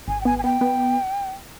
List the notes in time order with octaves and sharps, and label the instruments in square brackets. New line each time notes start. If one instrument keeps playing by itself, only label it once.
[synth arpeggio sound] G#1 [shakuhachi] G#5
[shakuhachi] G5
[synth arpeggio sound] B3 [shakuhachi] G#5
[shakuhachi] G#5
[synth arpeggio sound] B3 [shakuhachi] G5
[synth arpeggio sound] B3